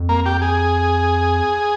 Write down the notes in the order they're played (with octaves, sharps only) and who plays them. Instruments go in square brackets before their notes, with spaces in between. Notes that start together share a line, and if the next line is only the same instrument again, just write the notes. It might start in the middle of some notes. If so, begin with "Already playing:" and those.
Already playing: [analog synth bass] F2
[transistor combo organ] A#3
G4
G#4